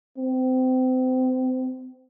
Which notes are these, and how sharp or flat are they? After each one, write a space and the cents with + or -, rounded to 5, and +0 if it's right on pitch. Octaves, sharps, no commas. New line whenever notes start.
C4 -30